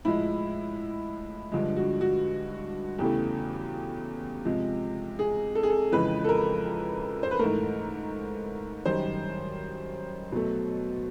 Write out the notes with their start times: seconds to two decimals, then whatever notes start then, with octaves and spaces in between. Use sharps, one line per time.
0.05 A2 F3 G#3 E4
1.52 G2 D3 F3 G#3
1.76 F#4
2.01 F#4
2.98 E2 C#3 E3 A3 G4
4.45 C3 F3 G#3
5.19 G#4
5.55 A4
5.63 G#4
5.70 A4
5.92 F2 C#3 E3 G#3 B4
6.24 A4
6.29 A#4
7.23 C5
7.31 B4
7.39 G#2 E3 A3 A#4
8.85 F#2 D#3 G3 C5
10.32 B2 F#3 A3